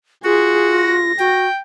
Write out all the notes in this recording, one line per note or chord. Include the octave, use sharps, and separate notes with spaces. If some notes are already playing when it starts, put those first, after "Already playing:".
F4 F#4 G#4
A#6
F#4 G5